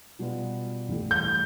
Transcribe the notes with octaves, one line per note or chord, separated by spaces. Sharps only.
B2 G3 B3 F4 B4
G2 E3 A3 E4 G4
G6